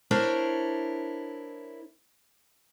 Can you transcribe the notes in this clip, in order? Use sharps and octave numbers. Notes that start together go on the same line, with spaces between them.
D4 E4 A#4 C5 C#5